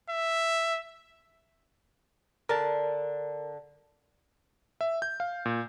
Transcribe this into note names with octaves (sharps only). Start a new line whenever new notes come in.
E5
D3 A#4 A5
E5
G6
F5
A#2